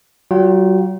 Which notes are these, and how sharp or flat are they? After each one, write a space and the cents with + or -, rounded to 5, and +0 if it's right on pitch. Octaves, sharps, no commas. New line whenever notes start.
F#3 +40 F4 +30 G5 -30